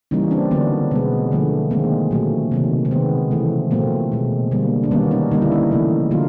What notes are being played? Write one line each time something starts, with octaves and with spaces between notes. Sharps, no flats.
C#3 E3 G3 A#3 C#4 D#4
C4 D4
D3 F#3 A#3 B3 C#4
B2 G#3 B3
D3 F3 A3
D#3 G#3 A#3 C4
A#2 F#3 A3
C3 D#3 F#3
C4
D#3 G#3 B3
C#3 E3 A3
A#2 F#3 A3 A#3 C4
B2 G#3
D3 G3 A#3
D4
D#3 G3 A#3 B3 C#4
C#4 D#4
D3 G3 A#3 D#4
E4
C#4 D#4
C#3 E3 A3
D3 F#3 A#3 D#4 F4